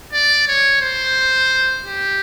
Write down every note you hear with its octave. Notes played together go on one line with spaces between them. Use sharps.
D5
C#5
C5
G4